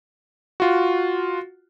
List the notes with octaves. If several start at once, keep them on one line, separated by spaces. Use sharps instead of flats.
F4 F#4